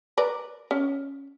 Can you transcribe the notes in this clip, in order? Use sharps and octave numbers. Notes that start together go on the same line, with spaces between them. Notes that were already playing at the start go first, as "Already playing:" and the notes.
A#4 B4 D5
C#4